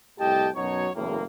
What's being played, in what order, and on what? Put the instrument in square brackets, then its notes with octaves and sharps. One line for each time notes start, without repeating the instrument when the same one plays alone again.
[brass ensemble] C2 A2 G4 D#5 G5 A5
F#2 B2 F#3 D#4 C#5
F#1 E2 A2 A#3